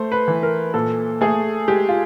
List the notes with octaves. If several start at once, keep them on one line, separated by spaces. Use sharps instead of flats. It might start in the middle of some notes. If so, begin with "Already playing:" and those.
Already playing: A3 C5
B4
E3
A#4
A#2 A4
A3 G#4
G#3 G4
F4